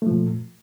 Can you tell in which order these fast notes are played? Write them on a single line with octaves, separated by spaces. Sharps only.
A3 F3 A#2